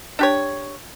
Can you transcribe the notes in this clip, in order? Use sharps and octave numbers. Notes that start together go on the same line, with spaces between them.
D4 G4 C#5